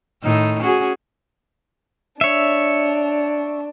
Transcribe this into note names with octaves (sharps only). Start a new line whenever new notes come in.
A2 D#3 D#4
C#4 F#4 G#4
D4 C#5 E5